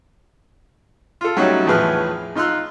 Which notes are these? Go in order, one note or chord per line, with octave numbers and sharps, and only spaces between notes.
F4 A4
F#3 G3 A3 C#4 D#4 F#4
E2 A2 F3 G#4 B4 F6
D#4 F4 C6 E6 F#6